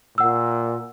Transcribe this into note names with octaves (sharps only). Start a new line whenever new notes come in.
A#2 F#5 E6